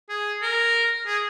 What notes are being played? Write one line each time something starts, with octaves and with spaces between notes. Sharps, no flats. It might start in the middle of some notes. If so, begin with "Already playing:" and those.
G#4
A#4
G#4